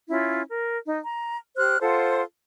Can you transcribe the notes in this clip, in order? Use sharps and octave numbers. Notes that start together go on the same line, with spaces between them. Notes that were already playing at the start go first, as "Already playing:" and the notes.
C#4 E4 F4
A#4
D#4
A#5
G4 C5 F6 F#6
F4 A4 C5 F#5